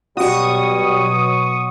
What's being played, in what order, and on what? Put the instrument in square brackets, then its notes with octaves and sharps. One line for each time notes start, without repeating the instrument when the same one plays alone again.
[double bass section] B2 F#3 [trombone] G3 [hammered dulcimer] F#4 [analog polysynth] C#6 D#6